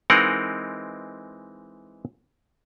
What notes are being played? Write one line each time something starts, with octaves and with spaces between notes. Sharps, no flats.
E3 G#3 C4 D#4 A#4 F#5